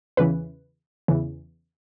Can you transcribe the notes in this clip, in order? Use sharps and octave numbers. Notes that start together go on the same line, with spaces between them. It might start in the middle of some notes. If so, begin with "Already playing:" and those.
E2 C#3 E3 B4
E2 C#3 E3